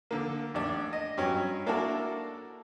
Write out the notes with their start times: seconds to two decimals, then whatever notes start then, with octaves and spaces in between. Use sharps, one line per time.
0.11 D3 A#3
0.54 A1 D4
0.93 D#5
1.17 G2 F#3 C#4
1.66 A#3 D4 E4 F#4 A4 A#4